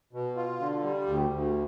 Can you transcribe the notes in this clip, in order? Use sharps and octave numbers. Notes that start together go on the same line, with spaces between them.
B2
F4
D3
G3
D2
D2